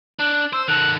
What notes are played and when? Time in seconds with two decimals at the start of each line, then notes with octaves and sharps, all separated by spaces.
0.19 D4 F#6
0.53 C5 E6
0.68 D#3 A4 F#6